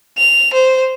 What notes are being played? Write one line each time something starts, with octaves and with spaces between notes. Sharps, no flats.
F7
C5